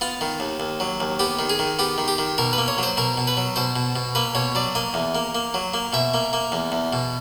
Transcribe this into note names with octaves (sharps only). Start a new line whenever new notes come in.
B3 F4
D#3
D#2
D#2
F#3
D#2
B3 G4
D#3
G#4
D#3
B3 G4
D#3
G4
D#3
B2 A#4
B4
A#3
C#5
F#3 C5
B2 A#4
B2
B4
F#3
B2 C5
B2
B2
A#3 B4
B2 C#5
F#3 D5
A#3 D#5
E2
A#3
A#3
F#3
A#3
B2 E5
A#3
A#3
E2
E2
B2